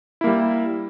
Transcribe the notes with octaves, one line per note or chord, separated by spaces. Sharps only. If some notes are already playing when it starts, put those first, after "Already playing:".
G3 A#3 E4